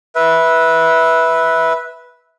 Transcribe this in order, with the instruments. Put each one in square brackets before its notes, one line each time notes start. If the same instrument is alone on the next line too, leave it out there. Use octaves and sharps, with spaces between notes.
[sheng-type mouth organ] B4 E5